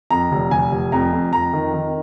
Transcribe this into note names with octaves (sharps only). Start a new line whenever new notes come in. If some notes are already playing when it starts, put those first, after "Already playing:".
F2 A#5
F1
F1 G#5
F1
F2 A#5
F2
F2 A#5
D#3
D#3